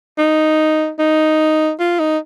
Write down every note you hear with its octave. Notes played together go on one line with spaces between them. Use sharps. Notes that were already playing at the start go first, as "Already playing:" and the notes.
D#4
D#4
F4
D#4